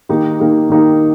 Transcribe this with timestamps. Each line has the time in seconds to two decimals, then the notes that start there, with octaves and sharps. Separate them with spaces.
0.09 D#3 A#3 D#4 G4
0.40 D#3 A#3 D#4 G4
0.70 D#3 A#3 D#4 G4